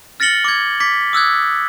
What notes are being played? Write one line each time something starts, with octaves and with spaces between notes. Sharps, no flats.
F6 A6 A#6 C#7 F#7 G7
D6 G#6
D6 G#6 B6
D#6 E6 F#6 G#6